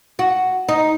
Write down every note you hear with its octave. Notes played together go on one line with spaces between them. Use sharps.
F#4
D#4